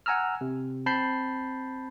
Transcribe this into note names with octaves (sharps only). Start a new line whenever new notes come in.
F#5 G#5 A#5 E6 F6
C3
C4 A5 B5 G6 C7